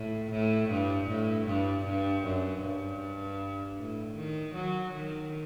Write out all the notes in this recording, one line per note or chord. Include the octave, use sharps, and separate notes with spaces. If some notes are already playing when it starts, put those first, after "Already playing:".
Already playing: A2
A2
G2
A2
G2
G2
F#2
G2
A2
D#3
F#3
D#3